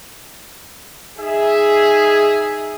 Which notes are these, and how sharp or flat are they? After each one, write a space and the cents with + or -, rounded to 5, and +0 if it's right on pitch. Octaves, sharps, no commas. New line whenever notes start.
D#4 +0 G#4 +0 E5 +0